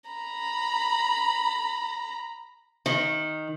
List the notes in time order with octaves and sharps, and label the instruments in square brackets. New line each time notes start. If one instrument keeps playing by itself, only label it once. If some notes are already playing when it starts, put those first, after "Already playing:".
[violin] A#5 B5
[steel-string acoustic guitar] D#3